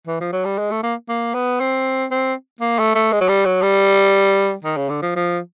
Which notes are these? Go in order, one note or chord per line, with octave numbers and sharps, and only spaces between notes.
E3
F3
F#3
G3
G#3
A3
A#3
A#3
B3
C4
C4
A#3
A3
A3
G#3
F#3
G3
F#3
G3
D#3
C#3
D3
F3
F3